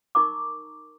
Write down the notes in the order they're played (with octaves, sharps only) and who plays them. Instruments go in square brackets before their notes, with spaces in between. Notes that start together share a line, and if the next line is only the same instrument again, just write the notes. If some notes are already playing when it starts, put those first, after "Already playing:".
[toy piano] D#4 A#4 A#5 C#6 D6